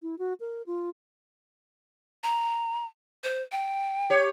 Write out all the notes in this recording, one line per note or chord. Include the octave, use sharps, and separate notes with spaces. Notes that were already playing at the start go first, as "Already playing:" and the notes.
E4
F#4
A#4
F4
A#5
C5
G5
G4 C#5